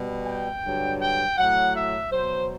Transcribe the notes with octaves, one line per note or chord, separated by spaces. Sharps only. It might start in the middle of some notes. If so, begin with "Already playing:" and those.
Already playing: B2 G3
G5
G2 D3 F#3
G5
A2 F#3 F#5
E5
B2 F#3 C5